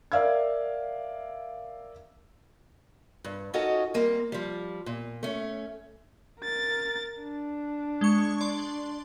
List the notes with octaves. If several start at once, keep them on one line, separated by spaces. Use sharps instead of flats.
A#4 D5 E5 F5 E6 G#6
G2
C#4 D#4 F4 F#4 A4 D#5
G3 A#3 C4
F3 G3
A#2
A3 C#4
A#4 A6
D4
G#3 C#6
D5 C6